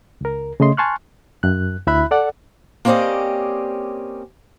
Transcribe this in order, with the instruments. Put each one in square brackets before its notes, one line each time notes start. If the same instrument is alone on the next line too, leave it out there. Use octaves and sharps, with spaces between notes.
[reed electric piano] C#2 A#4
C#3 A3 D#5 C6
G#5 A5 C6 C#6 F6 F#6
F#2 F#6
D2 E4 E5 B5 F#6
A4 D5 F#5
[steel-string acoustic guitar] A#3 C4 C#4 G4 D5 D#5